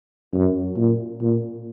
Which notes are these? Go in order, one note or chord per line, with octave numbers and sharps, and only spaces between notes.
F#2
A#2
A#2